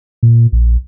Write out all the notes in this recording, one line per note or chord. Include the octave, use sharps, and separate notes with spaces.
A#2
A#1